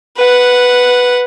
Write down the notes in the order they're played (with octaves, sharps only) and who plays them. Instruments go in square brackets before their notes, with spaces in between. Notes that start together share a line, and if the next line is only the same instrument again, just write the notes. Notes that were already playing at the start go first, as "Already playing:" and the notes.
[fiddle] B4 F#5